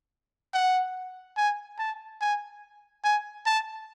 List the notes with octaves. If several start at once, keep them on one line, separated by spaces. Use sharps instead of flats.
F#5
G#5
A5
G#5
G#5
A5